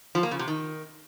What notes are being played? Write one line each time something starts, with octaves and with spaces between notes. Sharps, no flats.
F3
A#3
C#3
C3
D#3